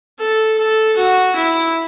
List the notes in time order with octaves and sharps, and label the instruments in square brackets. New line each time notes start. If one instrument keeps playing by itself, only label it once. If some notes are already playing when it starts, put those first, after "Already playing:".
[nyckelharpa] A4
A4
F#4
E4